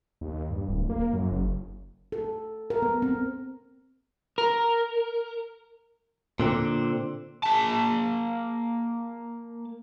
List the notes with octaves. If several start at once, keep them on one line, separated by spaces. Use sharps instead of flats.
D#2
G2
D1
A#3
F#2
F#1
A4
A#4
B3
C4
A#4
A#2 D3 C4
A#3 A5